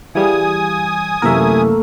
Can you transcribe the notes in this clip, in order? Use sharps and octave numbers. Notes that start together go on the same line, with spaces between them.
E3 G3 G4 G#4 F5 G#5 D#6
F#2 C3 E3 A3 A#3 A#4 E5